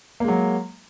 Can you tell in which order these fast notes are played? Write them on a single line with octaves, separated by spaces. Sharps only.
A#3 G#3 F#3